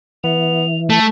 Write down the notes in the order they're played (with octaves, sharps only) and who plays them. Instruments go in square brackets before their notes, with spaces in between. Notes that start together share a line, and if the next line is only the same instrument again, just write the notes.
[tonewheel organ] E3 [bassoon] B3 [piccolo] F7
[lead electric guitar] A3 [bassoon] A4 [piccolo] B6